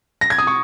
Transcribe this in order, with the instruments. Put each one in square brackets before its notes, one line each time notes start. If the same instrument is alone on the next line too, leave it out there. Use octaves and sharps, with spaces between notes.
[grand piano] A#6
G#6
D#6
C#6